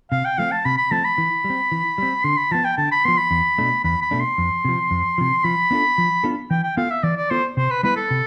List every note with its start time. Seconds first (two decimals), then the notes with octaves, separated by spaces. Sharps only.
0.12 C3 F5
0.25 G5
0.38 F3 A3 C4 F5
0.52 A5
0.65 C3 B5
0.78 B5
0.91 F3 A3 C4 A5
1.05 B5
1.18 E3
1.44 G3
1.50 C4
1.72 E3
1.98 G3 C4
2.24 D3 C6
2.38 B5
2.51 F3 B3 A5
2.65 G5
2.78 D3 A5
2.92 B5
3.05 F3 B3 C6
3.18 B5
3.31 E2
3.58 B2 A3 D4
3.84 E2 B5
4.02 B5
4.11 B2 A3 D4
4.20 C6
4.38 F2
4.65 C3 F3
4.91 F2
5.18 C3 F3
5.44 F3 B5
5.71 B3 D4 F4 A4
5.98 F3
6.24 B3 D4 F4 A4
6.51 E3 G5
6.64 G5
6.77 B3 F4 A4 F5
6.91 E5
7.03 E3 D5
7.17 D5
7.30 B3 F4 A4 C5
7.57 C3 C5
7.71 B4
7.83 G3 B3 E4 B4
7.97 A4
8.11 C3